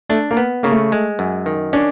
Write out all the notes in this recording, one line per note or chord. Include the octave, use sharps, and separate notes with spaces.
A3 D4
A#3
B3
C#3 A#3
A3
G#3
F#2
D#3
C#4 D4